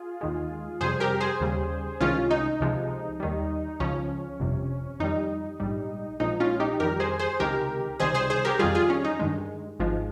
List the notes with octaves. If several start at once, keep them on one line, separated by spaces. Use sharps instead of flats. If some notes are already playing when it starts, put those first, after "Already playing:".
Already playing: F4 G#4
D#2 D#3 G#3
F2 C3 G3 G#4 C5
G4 A#4
G#4 C5
D#2 C#3 G3
C2 C3 D#3 G#3 C#4 F4
D#4
C#2 C3 F3 G#3
D#2 D#3 G3
C#2 C#3 F3 C#4
G1 F2 C3
F2 D#3 G3 D#4
A#1 G#2 G3
A#1 A#2 F3 G#3 D#4
C#4 F4
D#4 G4
F2 D#3 G3 G4 A#4
G#4 C5
G#4 C5
C#2 C3 D#3 G#3 G4 A#4
C#2 C3 D#3 G3 G#4 C5
G#4 C5
G#4 C5
G4 A#4
F2 D#3 G3 F4 G#4
F4 G#4
C#4
D#4
G2 D#3 G#3
G#1 G#2 F3 G#3